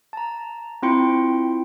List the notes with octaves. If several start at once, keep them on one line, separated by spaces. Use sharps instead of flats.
A5 A#5
C4 E4 F4 G5 C6 C#7